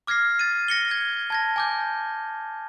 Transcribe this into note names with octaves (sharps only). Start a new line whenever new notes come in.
D6 F6 G#6 A#6 C7
A6 D#7
A#6 C#7 G7
G#6
A5 G#6 A#6
G#5 D6 G6